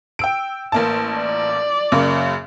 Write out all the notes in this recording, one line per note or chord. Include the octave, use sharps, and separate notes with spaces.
G5 E6 D7
A1 A#3 A5
D5
F#2 C#3 A#3